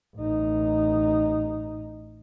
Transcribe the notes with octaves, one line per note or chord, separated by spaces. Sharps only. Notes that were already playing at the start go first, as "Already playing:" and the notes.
A1 D#4